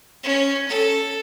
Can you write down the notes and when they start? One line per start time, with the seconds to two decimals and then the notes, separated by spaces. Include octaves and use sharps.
0.24 C#4
0.68 A4